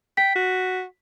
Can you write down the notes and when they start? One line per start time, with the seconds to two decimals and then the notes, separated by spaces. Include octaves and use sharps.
0.17 G5 B6
0.35 F#4